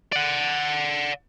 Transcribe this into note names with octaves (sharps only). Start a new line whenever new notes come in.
D5 F#5